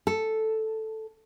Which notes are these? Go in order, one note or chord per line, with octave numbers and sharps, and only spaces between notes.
A4